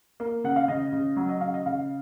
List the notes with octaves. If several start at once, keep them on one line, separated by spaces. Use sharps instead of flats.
A#3
C#3 F#5
F5
C#3 D#5
C#3
F#3
D#5
C#3 F5
D#5
C#3 F5